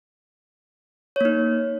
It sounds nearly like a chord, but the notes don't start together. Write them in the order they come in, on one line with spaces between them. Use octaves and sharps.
C#5 A#3 D#4